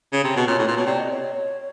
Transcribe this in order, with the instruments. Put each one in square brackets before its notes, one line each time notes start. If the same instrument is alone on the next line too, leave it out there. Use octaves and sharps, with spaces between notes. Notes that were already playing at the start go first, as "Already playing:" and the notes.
[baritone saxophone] C#3
C3
B2
[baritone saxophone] A#2 [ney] C#5
[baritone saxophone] A2
A#2
B2
[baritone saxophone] C3 [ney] D5
[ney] D#5
C#5